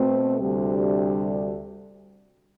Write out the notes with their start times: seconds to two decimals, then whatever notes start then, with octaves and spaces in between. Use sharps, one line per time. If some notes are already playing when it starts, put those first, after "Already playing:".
Already playing: B2 A3 C4
0.38 D2 C3 G3